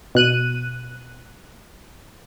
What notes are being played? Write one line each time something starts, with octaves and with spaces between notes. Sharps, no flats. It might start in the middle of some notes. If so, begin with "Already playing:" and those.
B2 F#6 D#7